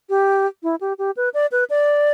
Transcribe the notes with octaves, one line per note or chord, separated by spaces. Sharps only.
G4
E4
G4
G4
B4
D5
B4
D5